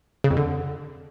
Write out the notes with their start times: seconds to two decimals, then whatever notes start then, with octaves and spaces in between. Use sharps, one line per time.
0.24 C#3
0.31 F2
0.37 D3